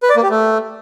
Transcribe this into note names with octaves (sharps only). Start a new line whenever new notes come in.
B4
D5
A#3
G4
A3